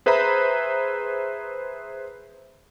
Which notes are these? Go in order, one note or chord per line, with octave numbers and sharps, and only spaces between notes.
G#4 B4 C5 E5 A#5 B5